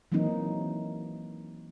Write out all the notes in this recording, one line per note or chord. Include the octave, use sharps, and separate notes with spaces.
E3 F#3 A#3 C4 D#4